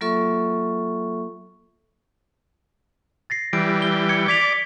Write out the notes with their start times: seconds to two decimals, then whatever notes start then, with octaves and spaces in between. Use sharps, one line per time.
0.01 F#3 A#3 F4 A4 E5 C#6
3.30 A6 A#6 C7
3.53 E3 G3 D7
3.82 G7
4.09 G#6 C#7 G7
4.28 D5 D6 G#6 B6 F7